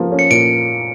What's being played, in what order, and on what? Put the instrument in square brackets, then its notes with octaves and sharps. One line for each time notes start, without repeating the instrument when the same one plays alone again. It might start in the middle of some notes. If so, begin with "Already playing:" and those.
Already playing: [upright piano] F3 A#3
C#4
[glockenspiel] C#7
[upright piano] A#2 [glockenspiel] D7